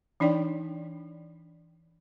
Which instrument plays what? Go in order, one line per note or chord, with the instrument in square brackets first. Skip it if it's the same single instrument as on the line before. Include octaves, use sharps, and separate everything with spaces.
[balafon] E3 D4 D#4 D5 G5